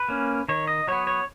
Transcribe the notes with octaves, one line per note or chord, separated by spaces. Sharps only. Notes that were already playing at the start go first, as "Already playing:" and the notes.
Already playing: B4
A#3 C#4
D#3 C#5
D#5
F#3 B3 C#5
C#5